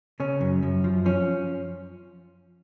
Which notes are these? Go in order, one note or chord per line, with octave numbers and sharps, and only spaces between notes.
C#3 C#4
F#2
F#2
F3
F3 C#4